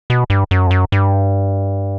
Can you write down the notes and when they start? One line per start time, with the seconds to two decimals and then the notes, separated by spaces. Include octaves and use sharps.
0.10 B2
0.30 G2
0.51 F#2
0.67 F2
0.71 F#2
0.92 G2